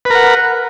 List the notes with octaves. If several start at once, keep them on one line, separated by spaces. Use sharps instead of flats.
A#4 B4 F#5